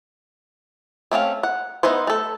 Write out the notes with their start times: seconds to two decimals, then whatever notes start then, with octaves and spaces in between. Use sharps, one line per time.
1.11 A3 C4 C#4 F5
1.43 F#5
1.83 B3 D#4 E4 B4 C5
2.07 A3 A4